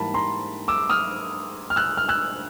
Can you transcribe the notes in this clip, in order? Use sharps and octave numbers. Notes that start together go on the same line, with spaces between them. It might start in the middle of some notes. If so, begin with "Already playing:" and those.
Already playing: G#2 E3 G3 A#3 A5 B5
A#5 C6
D6 E6
D#6 F6
F6
E6 F#6
F6
E6 F#6